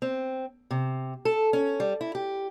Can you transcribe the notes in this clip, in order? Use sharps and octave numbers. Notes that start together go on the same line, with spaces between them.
C4
C3
A4
C#4
G3
E4
G4